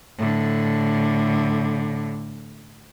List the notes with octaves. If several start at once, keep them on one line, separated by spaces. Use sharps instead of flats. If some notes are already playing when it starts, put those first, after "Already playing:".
A2 D3